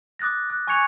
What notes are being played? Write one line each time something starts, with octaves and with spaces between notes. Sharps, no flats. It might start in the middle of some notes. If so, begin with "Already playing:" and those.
D6 D#6 F#6 A6 A#6
F#6
G#5 C#6 F#6 G#6 C#7 F7